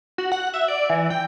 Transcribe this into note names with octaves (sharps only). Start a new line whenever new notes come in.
F#4
F#5
E5
D5
E3
G5